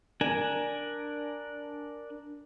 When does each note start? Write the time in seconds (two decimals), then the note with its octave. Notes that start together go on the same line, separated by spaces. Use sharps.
0.21 D4 A#4 G#5